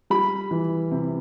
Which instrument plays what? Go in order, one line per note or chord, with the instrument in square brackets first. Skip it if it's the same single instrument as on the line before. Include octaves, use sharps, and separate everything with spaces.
[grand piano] G3 [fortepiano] B5
[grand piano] E3
C3